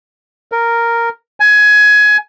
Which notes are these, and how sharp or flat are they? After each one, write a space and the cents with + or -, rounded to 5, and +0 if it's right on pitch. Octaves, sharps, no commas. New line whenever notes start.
A#4 -5
G#5 +20